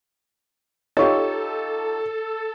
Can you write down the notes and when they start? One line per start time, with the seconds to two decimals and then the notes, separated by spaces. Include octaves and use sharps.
0.97 D#4 F4 G4 A4 C#5 C#6